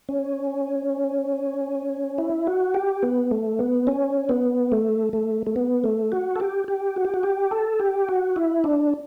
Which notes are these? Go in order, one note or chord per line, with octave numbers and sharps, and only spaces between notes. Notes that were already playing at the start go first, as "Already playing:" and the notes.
C#4
E4
F#4
G4
B3
A3
B3
C#4
B3
A3
A3
A3
B3
A3
F#4
A4
G4
G4
F#4
G4
F#4
G4
A4
G4
F#4
E4
D4